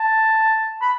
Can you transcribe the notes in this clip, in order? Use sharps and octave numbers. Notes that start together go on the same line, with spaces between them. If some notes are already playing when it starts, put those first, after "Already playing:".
Already playing: A5
B5